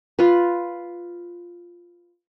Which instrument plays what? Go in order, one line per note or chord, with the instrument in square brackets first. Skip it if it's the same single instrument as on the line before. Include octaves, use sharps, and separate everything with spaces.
[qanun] F4 B4